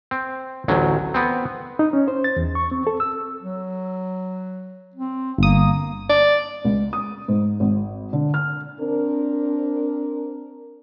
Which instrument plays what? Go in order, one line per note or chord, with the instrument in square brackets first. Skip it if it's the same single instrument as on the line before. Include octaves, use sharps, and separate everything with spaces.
[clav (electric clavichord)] C4
A1 D2 F#3
B3 C4
[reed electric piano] D#4
C#4
C5
A6
E2
C#6
C4
A4
E6
[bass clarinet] F#3
C4
[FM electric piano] G1 D#6 [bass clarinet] A#3
[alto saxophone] D5
[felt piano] C#2
D#6
G#2
G#1
D3
F6
[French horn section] C4 D4 A#4